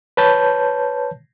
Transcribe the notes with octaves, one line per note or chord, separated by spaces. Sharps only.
B4 C#5 A5 G6